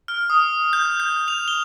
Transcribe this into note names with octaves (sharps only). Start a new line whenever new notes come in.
F6
D#6
G6
G6
F7
G7